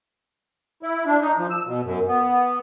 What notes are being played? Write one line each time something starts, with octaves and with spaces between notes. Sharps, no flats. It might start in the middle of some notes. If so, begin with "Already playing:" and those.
E4
D4
D#4
F3
E6
B2
F#2
B3